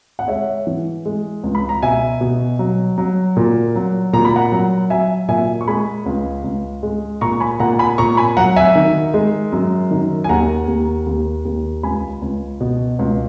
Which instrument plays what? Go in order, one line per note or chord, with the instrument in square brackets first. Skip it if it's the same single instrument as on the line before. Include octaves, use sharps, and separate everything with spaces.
[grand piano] F#5
G#3 C#5 E5
E3
G#3
C#2
B5
A#5
B2 E5 G#5
B2
F#3
F#3
A#2
F#3
A#2 A#5
B5
F#5 A#5
F#3
F#3 E5 G#5
A#2 E5 G#5
C#6
G#3 G#5 B5
C#2
C#2
G#3
A#2 A#5 C#6
G#5 B5
A#2 F#5 A#5
G#5 B5
A#2 A#5 C#6
G#5 B5
F#3 F#5 A#5
E5 G#5
D#3
G#3
F#2
D#3
G#5
D#2 F#5 A#5
D#2
D#2
D#2
C#2 G#5 B5
C#2
B2
C#2